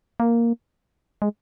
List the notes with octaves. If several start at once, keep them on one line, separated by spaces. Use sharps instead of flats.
A#3
G#3